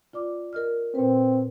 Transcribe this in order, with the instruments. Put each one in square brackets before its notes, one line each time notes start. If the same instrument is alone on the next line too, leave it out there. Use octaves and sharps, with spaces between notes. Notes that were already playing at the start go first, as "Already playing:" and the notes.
[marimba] F4 D5 D6
A#4 D#5 F6
[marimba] A#2 B4 [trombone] C4